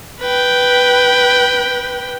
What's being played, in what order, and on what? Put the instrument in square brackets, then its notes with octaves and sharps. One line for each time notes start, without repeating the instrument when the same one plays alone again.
[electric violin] B4 G5